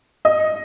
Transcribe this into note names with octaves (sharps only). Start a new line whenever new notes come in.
D#5